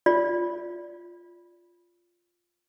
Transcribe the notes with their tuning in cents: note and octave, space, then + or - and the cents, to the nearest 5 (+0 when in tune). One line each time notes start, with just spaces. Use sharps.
F4 +0 D5 -10